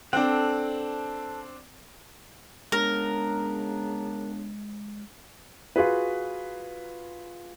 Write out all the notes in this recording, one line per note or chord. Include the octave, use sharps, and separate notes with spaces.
C4 D4 A4 F#5
C#3 G#3 B3 D4 A#4
F4 F#4 G#4 B4